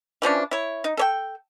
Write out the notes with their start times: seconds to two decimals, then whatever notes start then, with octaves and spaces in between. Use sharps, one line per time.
0.22 E3 F3 C#4 D4
0.51 E4 C#5
0.84 D#4
0.97 A4 C#5 G5